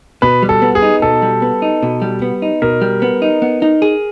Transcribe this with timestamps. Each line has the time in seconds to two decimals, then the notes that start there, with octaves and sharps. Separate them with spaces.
0.22 B2 B4
0.43 G3
0.49 A4
0.62 B3
0.75 G#4
0.82 D#4
1.02 B2 A4
1.22 G3
1.42 B3
1.62 D#4
1.83 B2
2.02 G3
2.22 B3
2.42 D#4
2.62 B2 A#4
2.82 G3
3.02 B3
3.22 D#4
3.42 B3
3.62 D#4
3.82 G#4